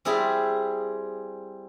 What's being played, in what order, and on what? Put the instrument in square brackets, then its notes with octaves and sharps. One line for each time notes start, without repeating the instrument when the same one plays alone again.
[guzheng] G3 C4 E4 G#4 E5 A5